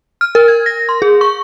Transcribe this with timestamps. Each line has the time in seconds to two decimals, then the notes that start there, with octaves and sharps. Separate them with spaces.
0.21 F6
0.35 A#4
0.48 G#6
0.66 A#6
0.89 C6
1.02 G#4
1.21 C#6